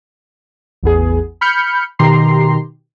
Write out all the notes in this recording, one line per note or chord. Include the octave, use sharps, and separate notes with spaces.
A1 E2 B3 G#4
B5 F6 G6 C#7
B2 D#3 G4 A#5 C6 C7